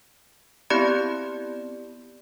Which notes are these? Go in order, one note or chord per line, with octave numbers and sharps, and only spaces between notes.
B3 C4 E4 G4 D5 B5